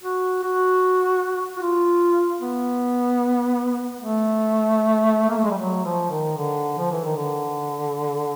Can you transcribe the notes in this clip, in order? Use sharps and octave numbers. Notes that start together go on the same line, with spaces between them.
F#4
F#4
F#4
F4
B3
A3
A#3
A3
G#3
G3
F#3
F3
D#3
D3
F3
E3
D#3
D3